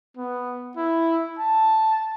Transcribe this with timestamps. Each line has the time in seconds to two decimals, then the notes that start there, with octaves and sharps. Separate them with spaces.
0.17 B3
0.77 E4
1.39 A5